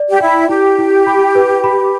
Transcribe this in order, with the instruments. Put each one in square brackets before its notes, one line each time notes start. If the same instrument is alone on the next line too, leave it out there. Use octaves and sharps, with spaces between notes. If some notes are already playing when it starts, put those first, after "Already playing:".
Already playing: [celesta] D5
[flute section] G4
[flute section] E4 [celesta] G5
[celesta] E4 [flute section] G4
[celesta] E4
B5
B4
B5